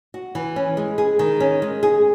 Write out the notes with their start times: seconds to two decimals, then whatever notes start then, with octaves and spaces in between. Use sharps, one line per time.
0.14 F#4
0.35 E3
0.56 C#4
0.77 G#3
0.98 G#4
1.19 D#3
1.40 C#4
1.62 G#3
1.83 G#4